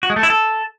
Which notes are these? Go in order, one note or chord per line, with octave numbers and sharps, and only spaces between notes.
F#4
G#3
A3
E4
A4